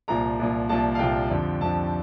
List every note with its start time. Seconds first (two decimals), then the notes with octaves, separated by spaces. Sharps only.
0.08 C2 A#2 F3 A#5
0.39 C2 A#2 F3
0.69 C2 A#2 F3 A5
0.95 F5
0.99 C2 A#2 F3 G5
1.30 F2 D3 F3
1.61 F2 D3 F3 A5